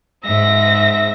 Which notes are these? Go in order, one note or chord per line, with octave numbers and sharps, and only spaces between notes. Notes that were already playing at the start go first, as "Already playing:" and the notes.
G#2 E5 A#6